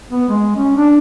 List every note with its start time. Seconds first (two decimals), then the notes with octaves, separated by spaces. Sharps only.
0.10 B3
0.29 G#3
0.56 C#4
0.76 D4